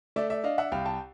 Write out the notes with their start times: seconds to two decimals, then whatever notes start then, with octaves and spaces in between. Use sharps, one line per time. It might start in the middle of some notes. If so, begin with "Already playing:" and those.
0.16 A3 D5 E5
0.30 D5 E5
0.44 D4 D#5 F5
0.58 E5 F#5
0.72 C2 F5 G5
0.85 G5 A5